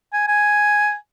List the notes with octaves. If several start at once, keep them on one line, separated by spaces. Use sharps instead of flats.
G#5
G#5